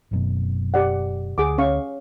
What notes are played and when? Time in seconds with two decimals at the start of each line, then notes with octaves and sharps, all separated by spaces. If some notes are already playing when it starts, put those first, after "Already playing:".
0.11 F#1 F#2 B2
0.74 G4 D5 F#5
1.38 D2 G#4 F#5 D6
1.58 C#4 F5 C#6